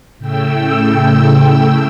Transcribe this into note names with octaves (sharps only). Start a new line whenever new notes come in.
A2 C#3 A3 G5 E6